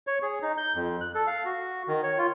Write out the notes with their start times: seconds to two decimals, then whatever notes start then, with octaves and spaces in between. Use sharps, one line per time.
0.07 C#5
0.22 G#4
0.42 D#4
0.58 G6
0.75 F2
1.01 F#6
1.15 A4
1.27 F5
1.45 F#4
1.88 D#3
2.03 C#5
2.18 F4